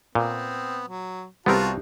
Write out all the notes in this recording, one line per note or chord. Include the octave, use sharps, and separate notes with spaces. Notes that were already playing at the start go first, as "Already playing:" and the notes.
A#2 B3 C4
F#3
C2 B3 C4 F4 F#4 A#4 A5